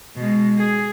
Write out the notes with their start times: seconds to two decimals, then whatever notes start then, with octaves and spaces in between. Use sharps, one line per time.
0.16 B2 G#3
0.58 G#4